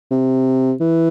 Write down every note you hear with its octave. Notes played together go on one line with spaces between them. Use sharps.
C3
E3